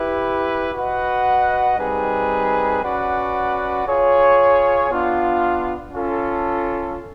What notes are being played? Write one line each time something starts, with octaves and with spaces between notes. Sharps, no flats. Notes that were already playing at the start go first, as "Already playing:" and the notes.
Already playing: E4 G4 B4
F#4 B4 D#5 F#5
G3 C4 D#4 G#4 B4
C#4 F#4 B4 D5 F#5
F4 G#4 C#5
B3 D4 F4
C#4 F4 A4